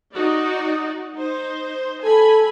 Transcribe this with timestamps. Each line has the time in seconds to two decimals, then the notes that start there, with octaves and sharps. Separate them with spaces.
0.14 D#4 F#4 D5
1.14 D#4 C5
2.04 A4 G#5 B5